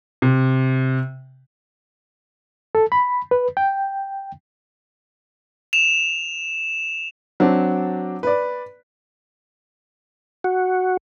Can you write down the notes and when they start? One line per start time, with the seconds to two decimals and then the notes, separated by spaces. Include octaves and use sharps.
0.22 C3
2.75 A4
2.92 B5
3.31 B4
3.57 G5
5.73 E7 F7
7.40 F#3 C4 D4
8.23 B4 D5
10.44 F#4